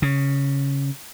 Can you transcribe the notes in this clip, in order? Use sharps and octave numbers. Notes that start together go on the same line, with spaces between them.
C#3